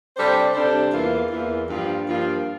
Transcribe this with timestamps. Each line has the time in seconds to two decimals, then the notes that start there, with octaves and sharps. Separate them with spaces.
0.17 C3 G3 D4 A4 C5
0.55 C3 G3 D4 A4 C5
0.92 E2 E3 A#3 F4
1.31 E2 E3 A#3 F4
1.70 G2 F3 A#3 F4
2.07 G2 F3 A#3 F4